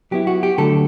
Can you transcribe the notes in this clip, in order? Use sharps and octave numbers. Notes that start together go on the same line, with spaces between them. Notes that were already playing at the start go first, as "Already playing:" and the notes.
F#3 B3 E4 G4
F#4
G4
D3 F#3 A3 A4